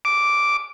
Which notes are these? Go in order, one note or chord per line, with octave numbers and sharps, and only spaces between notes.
D6